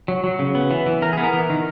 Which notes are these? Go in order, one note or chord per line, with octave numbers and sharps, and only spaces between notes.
F#3
F#3
C#3
B3
E3
E3
E3 A#4
B3 G#4
A#4
E3
D#3